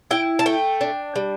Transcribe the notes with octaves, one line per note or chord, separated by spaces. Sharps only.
E4 G5
A5
A3 G5
D4
G3